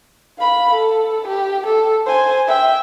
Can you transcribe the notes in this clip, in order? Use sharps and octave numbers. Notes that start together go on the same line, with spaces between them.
F5 B5
A4
G4
A4
C5 G#5
E5 G5